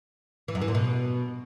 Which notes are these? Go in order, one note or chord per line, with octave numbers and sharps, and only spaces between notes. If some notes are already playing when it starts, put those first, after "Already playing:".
E3
F#2
E3
A#2
B2